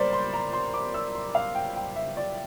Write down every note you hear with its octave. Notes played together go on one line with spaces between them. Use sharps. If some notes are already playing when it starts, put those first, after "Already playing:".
Already playing: G3 A#3 A#4 C5 D5
C6
A#5
C6
D6
E6
C6
F5
G5
G5
E5
D5